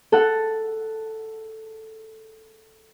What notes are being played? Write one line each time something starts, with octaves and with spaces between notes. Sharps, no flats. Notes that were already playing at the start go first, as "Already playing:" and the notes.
A4 F#5